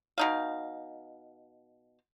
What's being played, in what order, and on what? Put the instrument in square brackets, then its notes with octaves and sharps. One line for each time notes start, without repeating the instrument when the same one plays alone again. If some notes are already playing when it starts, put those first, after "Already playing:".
[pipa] B2 D#4 F5